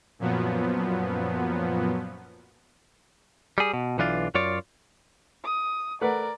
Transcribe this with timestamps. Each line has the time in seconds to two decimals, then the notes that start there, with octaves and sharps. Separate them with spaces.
0.19 F#2 A#2 F3 F#3 B3
3.58 G3 G#4
3.74 B2
3.98 B1 E3 D4 F4
4.35 F#2 F4 C#5 D5
5.44 D#6
6.01 A3 A#4 B4 D5 F#5